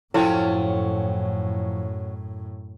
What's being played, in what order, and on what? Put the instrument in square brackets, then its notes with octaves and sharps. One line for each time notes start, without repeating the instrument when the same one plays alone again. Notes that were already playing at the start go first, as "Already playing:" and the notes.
[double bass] F#2 A2 [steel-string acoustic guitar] F3 G5 [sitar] F#3 C#4 A4 [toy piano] E4